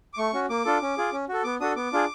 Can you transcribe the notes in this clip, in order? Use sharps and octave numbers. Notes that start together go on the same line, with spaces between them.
D6
A3 C#6
C#4 F#4
A#3 D6
D4 F4 A4
C#4
F4 G#4
C#4
F#4 A4
B3 D6
D4 F#4 A4 D#6
B3 D6
D4 F4 G#4